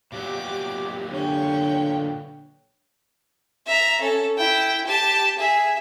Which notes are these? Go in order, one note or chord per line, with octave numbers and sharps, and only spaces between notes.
A#2 F#3 B3 G4 D6
D3 C#4 G5
E5 A#5
C#4 A4
E4 G5
G4 A5
G#4 E5